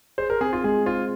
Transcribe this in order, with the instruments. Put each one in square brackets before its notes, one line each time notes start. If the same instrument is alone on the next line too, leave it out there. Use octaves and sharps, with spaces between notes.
[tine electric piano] G#4 [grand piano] C5
[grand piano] A#4
[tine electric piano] C4 [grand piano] G#4
[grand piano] F4
[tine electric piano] G#3 [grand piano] G#4
[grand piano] F4 [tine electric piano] C5